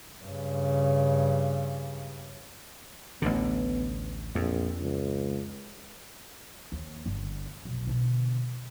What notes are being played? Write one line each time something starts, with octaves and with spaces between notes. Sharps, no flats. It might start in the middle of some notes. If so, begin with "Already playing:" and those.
G2 C#3
A1 D2 D3 B3
A#1 F2
C#2
D#2
G1 D3
F1 B1
B2 D3